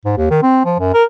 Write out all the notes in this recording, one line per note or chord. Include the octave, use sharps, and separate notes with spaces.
G#2
D#2
D#3
C4
F3
F#2
A#4